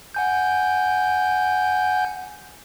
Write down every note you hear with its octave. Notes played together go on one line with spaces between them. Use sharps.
F#5 G#5 G6